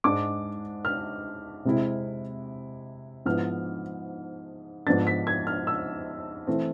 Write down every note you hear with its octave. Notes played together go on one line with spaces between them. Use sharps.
G#2 G#3 D4 D6
F6
C3 G#3 C4 E4
G#2 F3 B3 E4 F6
G#2 F3 B3 D4 A6
B6
G#6
F6
E6
E3 A3 C4